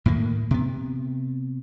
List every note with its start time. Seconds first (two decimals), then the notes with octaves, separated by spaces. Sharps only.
0.06 A2 D#3 A#3
0.51 C3 B3